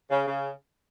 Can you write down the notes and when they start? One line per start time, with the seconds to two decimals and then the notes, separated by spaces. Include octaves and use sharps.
0.10 C#3
0.27 C#3